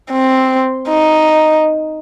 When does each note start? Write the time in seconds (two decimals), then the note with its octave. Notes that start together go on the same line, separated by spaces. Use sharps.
0.12 C4
0.89 D#4